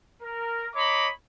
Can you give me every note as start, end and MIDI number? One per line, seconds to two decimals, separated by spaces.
0.23 0.69 70
0.75 1.08 73
0.75 1.08 75
0.75 1.08 82
0.75 1.08 83
0.75 1.08 86